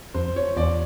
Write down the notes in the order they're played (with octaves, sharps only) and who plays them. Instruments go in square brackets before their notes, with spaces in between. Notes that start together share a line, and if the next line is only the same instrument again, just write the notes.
[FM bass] F2 [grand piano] C5
[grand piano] C#5
[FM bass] E2 [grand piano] D5